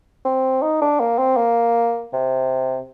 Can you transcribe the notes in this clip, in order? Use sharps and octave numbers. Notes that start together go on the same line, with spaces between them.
C4
D#4
D4
A#3
C4
A#3
C3